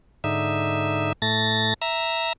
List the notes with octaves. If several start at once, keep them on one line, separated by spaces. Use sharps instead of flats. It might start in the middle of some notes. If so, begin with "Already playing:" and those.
G#2 D3 D#4 E5
A2 A3 A6 A#6
E5 A#5